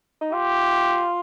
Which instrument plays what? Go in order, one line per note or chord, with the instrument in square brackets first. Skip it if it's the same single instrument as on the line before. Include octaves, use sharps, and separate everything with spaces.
[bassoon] D#4
[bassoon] F4 [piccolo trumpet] G4